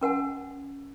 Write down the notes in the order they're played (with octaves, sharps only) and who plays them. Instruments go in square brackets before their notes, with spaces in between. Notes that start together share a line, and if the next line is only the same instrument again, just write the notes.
[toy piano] C#4 A#4 F#5 G#5